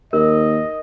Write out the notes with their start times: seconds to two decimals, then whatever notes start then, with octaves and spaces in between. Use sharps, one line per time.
0.13 D#2 A#4 D#5